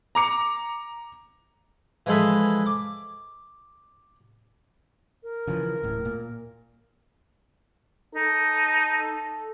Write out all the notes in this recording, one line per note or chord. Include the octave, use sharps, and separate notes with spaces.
A#5 D6 C#7
E3 F3 G#3 G#4 A4 B4
D6
A#4
C#3 E3 F3
D1 A2
A#2
D#4 A4